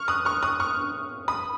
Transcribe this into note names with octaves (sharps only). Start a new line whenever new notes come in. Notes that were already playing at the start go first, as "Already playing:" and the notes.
Already playing: C#6 F6
D#6 F#6
C#6 F6
D#6 F#6
C#6 F6
B5 D#6